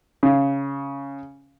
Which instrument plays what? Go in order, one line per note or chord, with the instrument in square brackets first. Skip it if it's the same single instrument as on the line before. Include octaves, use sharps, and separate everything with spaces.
[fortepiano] C#3